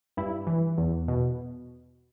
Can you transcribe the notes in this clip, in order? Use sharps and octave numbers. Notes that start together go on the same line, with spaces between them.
G2 E4
E3
E2
B2